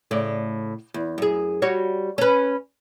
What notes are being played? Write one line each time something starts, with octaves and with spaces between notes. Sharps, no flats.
A2 C#3 D5
E2
F#2 G#4
G3 F#4 C#5
C#4 B4